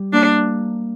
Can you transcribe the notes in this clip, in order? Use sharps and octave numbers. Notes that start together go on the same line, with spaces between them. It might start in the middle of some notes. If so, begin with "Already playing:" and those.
Already playing: G3
A#3 D4